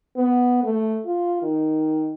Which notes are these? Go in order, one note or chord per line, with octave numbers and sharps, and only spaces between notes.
B3
A3
F4
D#3